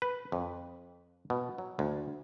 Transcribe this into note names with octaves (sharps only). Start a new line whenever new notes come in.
B4
F2
B2
F#3
D2